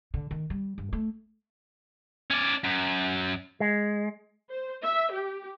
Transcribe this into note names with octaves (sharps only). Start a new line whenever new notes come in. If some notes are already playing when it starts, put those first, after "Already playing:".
D3
D#3
G3
G2
A3
C#4 D5
F#2
G#3
C5
E5
G4